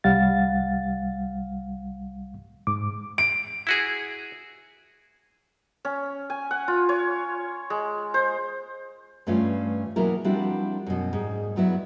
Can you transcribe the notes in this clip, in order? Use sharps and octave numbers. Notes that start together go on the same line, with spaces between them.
C2 G3 F5 F#5 A6
G#2 D6
D7
E4 F#4 G#4
C#4
G#5
F#5
F4
C#5
G#3
C5
G2 E3 A3 C#4 F4 F5
B2 E3 F#3 A#3 E4 A#4
F3 G3 C4 D4 E4 F#4
F#2 B2
G#2 G3
G2 F#3 B3 E4